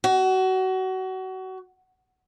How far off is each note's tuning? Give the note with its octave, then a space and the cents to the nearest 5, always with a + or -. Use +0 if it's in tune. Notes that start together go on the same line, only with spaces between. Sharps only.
F#4 +25